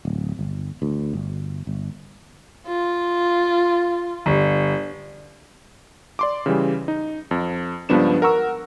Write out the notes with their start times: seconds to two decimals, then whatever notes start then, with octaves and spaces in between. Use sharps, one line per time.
0.05 D1
0.39 G1
0.82 D2
1.13 G1
1.67 G1
2.67 F4
4.26 G1
6.19 D5 C6 D6
6.46 C#3 E3 G3
6.88 D#4
7.31 F2
7.89 C#2 G2 F3 B3 D4 E7
8.22 A#4 F#5 A#5 C#6 E6